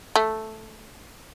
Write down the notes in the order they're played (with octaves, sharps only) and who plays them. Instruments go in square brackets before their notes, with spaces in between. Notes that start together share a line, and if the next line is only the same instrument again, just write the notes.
[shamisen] A3